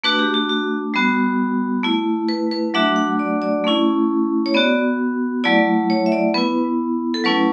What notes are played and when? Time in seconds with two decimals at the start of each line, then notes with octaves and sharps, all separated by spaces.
0.04 A3 D4 F#4 B4
0.19 G4
0.34 F#4
0.49 F#4
0.94 G3 B3 F#4
1.83 A3 E4
2.28 B4
2.51 B4
2.74 F#3 A3 D4 F#4 E5
2.96 F#5
3.19 D5
3.42 D5
3.64 A3 C#4 E4
4.46 C#5
4.54 B3 F#4 D5
5.44 F#3 A3 E4 D5
5.90 C#5
6.06 E5
6.12 D5
6.34 B3 E4 B4
7.14 A4
7.24 F#3 A3 C#4 E4 B4